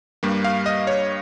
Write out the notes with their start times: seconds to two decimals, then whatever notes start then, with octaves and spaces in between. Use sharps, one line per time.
0.23 G2 G3 A#3
0.44 F5
0.66 D#5
0.87 C#5